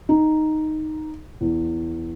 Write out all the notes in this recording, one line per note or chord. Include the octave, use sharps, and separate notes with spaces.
D#4
E2